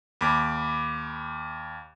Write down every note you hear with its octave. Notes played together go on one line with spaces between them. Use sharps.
D#2 B5 D6